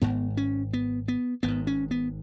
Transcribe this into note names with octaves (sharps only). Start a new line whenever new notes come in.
G#1 G#2 B3
C#4
B3
B3
G#1 G#2 B3
C#4
B3